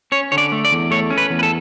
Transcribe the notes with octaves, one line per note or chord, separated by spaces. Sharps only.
C#4 C#5
D3 C#5
D5
A3
D5
E2
A3 C#5
C#4
B4
E2
B4
A4